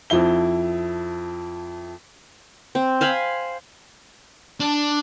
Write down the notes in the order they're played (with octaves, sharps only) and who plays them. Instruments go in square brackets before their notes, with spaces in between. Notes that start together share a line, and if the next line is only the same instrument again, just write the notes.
[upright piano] F2 F3 E4 G7
[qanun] C4
C5 F5 G#5 B5
[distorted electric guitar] D4